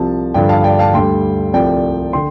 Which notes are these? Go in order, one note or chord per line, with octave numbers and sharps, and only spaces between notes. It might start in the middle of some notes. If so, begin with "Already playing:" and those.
Already playing: C2 C3 F3 A5
G2 D3 F3 D5 G5
F5 A5
D5 G5
F5 A5
D2 D3 G3 G5 C6
C2 C3 F3 A3 D5 G5
D3 G5 C6